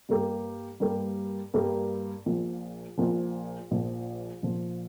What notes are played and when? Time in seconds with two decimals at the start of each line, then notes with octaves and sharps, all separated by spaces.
0.09 G2 G3 A#3 G4 A#4
0.80 G2 G3 A#3 G4 A#4
1.54 G2 G3 A#3 G4 A#4
2.26 A#1 A#2 F3
2.98 A#1 A#2 F3
3.71 A#1 A#2 F3
4.42 A#1 A#2 F3